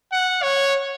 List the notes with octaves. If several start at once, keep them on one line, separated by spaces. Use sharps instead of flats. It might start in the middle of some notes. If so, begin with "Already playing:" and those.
F#5
C#5